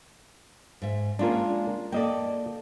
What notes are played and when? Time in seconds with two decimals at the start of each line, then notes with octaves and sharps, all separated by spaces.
0.82 G#2 E5
1.19 G#3 A#3 C#4 D4 F4 A#4
1.92 A#3 A4 D5 D#5 G5